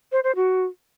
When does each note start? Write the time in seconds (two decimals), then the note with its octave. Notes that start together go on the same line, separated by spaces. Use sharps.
0.12 C5
0.24 C5
0.35 F#4